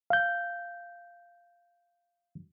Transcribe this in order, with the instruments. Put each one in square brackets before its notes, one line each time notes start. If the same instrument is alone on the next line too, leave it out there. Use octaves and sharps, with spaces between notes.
[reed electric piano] F5 G6